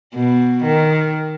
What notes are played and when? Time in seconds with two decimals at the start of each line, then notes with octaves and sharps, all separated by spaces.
0.14 B2
0.63 D#3